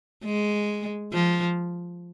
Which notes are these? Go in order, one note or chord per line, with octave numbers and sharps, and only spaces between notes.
G#3
F3